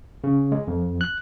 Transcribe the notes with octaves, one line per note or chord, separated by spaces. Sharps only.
C#3
G#3
F2
F#6